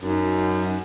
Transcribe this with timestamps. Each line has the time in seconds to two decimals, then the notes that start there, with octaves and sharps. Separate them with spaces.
0.02 F#2 D#4